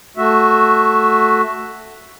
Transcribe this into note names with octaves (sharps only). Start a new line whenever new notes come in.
A3 F#4 E5